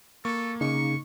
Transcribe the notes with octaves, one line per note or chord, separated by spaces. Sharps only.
A#3 A4 C#6
C#3 D#4 C#6 C#7